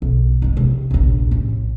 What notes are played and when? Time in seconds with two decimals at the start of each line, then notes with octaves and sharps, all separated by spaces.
0.02 B1
0.42 D#2 G#3
0.57 C3
0.91 A#1 D#2
1.31 A1